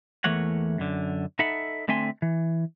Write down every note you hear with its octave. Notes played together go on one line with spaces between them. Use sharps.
E2 E3 A3 A#3 C#5 F#5
F#2 D3
D#4 A4 E5 F#5 B5
D3 A3 C4 E5 G#5 C6
E3